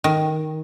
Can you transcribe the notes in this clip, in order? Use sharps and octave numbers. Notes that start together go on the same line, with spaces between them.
D#3